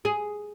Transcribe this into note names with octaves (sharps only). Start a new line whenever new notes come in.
G#4